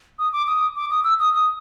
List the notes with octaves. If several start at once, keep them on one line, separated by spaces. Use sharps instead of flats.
D#6
D6
D#6
D6
D#6
E6
D#6
D#6